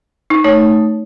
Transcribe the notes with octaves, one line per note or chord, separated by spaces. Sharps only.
D#4
A3 D#4 C#5